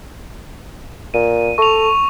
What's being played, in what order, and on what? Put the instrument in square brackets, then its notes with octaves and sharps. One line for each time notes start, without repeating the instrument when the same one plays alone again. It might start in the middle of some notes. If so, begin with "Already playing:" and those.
[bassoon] A#2 [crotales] D#7
[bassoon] A4 [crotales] C#6 F7